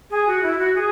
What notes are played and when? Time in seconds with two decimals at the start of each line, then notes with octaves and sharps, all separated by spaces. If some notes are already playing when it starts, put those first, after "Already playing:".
0.10 G#4
0.27 F#4
0.42 E4
0.58 F#4
0.75 G#4